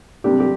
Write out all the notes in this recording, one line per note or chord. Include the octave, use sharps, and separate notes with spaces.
C3 G3 D4 G4
G4